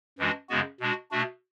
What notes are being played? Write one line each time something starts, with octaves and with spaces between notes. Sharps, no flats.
F#2 E3 G#3 D4 F#4
F#2 C#3 G#3 B3 F#4
B2 G#3 D4 F#4
B2 A3 D4 F#4